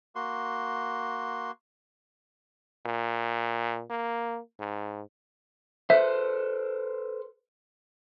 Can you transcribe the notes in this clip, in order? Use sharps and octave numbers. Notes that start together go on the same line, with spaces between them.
A#3 F#4 C6
A#2
A#3
G#2
A4 B4 C5 E5